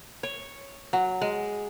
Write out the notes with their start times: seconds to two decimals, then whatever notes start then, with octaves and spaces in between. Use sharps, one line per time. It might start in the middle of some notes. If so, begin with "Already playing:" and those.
0.23 C#5
0.93 F#3
1.21 G#3